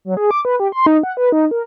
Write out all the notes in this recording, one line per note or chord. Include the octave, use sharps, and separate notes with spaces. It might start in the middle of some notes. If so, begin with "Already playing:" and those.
F#3
G#4
D6
B4
G4
C6
D#4
F#5
B4
D#4
A#4